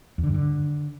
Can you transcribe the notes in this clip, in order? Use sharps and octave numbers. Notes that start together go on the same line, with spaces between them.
E2
D3
G2
D3